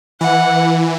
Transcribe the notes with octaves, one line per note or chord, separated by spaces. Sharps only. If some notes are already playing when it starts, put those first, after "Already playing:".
E3 F#5